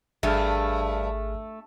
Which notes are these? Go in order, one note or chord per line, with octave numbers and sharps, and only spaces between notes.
G#1 G2 A3 G#4 F6